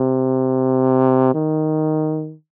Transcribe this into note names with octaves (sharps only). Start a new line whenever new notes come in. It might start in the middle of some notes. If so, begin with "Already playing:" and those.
Already playing: C3
D#3